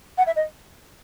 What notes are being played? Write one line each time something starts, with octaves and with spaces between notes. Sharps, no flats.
F#5
E5
D#5